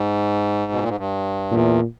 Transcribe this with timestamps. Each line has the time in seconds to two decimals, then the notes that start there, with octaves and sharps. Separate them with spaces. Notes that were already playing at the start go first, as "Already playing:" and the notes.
Already playing: G#2
0.72 B2
0.81 A#2
0.88 G#2
0.97 G2
1.51 E2 A#2